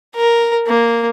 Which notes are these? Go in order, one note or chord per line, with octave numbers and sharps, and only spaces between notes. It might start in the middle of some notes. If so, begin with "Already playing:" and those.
A#4
A#3